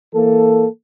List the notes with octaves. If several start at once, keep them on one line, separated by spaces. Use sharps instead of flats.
E3 A#3 A4